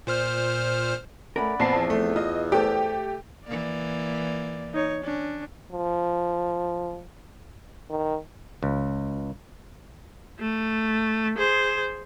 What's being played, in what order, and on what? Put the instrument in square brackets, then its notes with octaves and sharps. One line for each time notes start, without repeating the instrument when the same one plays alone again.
[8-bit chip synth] A#2 C5 F6
[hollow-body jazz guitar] A3 C#4 A#4 [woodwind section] D5 F#5 B5
[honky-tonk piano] A#1 A5 C7 [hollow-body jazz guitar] F3 B3 C4
[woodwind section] E2
[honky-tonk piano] A3
[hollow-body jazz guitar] F4 [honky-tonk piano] D#5
[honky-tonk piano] A3 G4 [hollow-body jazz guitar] A4 C5 G5
[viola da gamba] E3 A#3 [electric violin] D5
[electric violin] D#4 C#5
[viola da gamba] C#4 [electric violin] D4
[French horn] F3
D#3
[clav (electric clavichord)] C#2
[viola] A3
G#4 C5